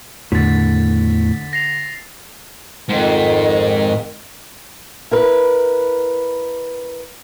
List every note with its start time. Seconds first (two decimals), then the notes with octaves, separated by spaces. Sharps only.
0.32 E2 A2 D3 A6 B6
1.53 A#6 C7 F7
2.89 F2 G#2 D#3
5.11 E4 A#4 B4